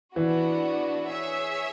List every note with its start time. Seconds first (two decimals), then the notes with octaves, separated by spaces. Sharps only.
0.16 E3 B3 D4 F#4
1.09 G#4 C#5 E5